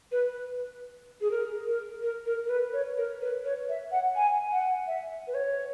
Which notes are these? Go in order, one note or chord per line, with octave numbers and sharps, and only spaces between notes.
B4
G#4
A#4
A#4
A#4
A#4
A#4
B4
C#5
A#4
B4
C#5
E5
F#5
G#5
F#5
E5
B4
C#5